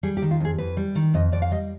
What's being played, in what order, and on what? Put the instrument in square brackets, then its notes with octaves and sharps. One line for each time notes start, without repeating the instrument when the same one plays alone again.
[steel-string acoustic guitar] G3 G#4
G4
D#3
F4
F2 G#4
F2 B4
G3
D#3
F2 D#5
F2 D5
F5
G3 D#5